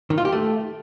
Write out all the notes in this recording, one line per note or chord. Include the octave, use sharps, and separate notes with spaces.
D#3
F4
G4
A3